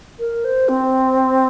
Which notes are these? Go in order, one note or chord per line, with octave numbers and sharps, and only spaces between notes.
A#4
C5
C4